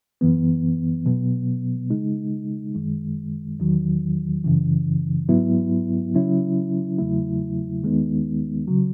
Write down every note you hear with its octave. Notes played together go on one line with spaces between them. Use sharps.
F#2 E3 B3
B2 F#3 B3
C#3 G#3 D#4
F#2 D#3 G#3
E2 D#3 F#3
F#2 C#3 E3
G#2 F#3 B3 E4
C#3 F#3 C#4 E4
E2 C#3 F#3 A3 E4
D#2 D#3 G#3 B3 D#4
C#3 F#3